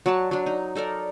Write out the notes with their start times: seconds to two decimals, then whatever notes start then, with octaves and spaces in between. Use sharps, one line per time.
0.06 F#3 F#4 D5 A5
0.31 F#3 D4
0.46 D#4
0.75 D#4 A4 A#4 D5